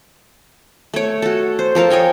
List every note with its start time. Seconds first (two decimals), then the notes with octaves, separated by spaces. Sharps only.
0.94 A3 C#5
1.22 F#4 A4
1.59 C5
1.75 F3 A4 A#4 F5
1.90 C#5 D#5 G5 G#5